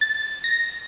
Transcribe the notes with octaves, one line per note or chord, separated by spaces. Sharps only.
A6
A#6